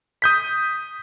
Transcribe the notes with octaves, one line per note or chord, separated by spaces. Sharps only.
D#6 G6 B6